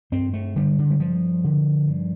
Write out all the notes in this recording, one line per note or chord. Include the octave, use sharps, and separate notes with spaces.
G2 C4
A3
D3 G3
D3
G3
G2 F3
D3
G2